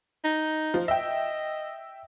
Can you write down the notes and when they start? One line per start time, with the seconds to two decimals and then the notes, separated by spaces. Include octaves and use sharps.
0.24 D#4
0.74 F3
0.88 D#5 E5 G5